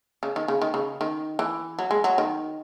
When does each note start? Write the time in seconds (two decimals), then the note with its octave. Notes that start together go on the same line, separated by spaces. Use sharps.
0.23 C#3
0.36 D#3
0.48 C#3
0.61 D#3
0.74 C#3
1.01 D#3
1.39 E3
1.79 F#3
1.91 G#3
2.04 F#3
2.18 D#3